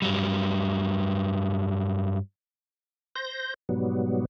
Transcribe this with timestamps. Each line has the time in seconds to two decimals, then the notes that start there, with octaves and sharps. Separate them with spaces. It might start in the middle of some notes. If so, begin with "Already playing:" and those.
0.02 G2 F#3 G3
3.16 C5 G6 A#6
3.69 G#2 B2 F#3 G3 B3